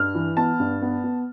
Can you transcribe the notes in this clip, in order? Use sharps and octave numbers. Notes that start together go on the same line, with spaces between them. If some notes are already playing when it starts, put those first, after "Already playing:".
Already playing: G2 F6
E3
B3 A5
G2
B3
B3